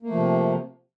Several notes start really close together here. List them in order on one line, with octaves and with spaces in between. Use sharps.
A#3 A3 F3 C3